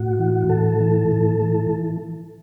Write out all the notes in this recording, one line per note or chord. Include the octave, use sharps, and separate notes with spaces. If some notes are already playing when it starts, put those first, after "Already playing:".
Already playing: A2 F#4
E3
A2 A4
E3
A2
E3